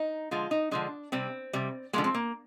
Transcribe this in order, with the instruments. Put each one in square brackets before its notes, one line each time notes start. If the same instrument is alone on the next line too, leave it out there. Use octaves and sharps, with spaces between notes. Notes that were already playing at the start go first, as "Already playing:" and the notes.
Already playing: [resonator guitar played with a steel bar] D#4
D3 F3 G#3 F4
D#4
D3 F3 G#3 D4
C3 G3 C4
C3 G3
D3 F3 G#3 A#3
C4
A#3